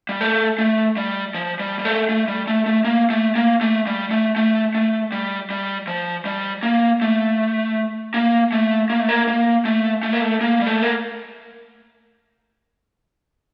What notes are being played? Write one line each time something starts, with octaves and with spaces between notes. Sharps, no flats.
G3
A3
A3
G3
F3
G3
G3
A3
A3
G3
A3
A3
A#3
A3
A#3
A3
G3
A3
A3
A3
G3
G3
F3
G3
A#3
A3
A#3
A3
A#3
A3
A#3
A#3
A3
A3
A#3
A3
A#3
G3
A3
A#3